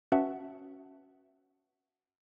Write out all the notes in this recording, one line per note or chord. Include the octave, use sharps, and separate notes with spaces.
C#4 F#4 B4 E5 F#5 A5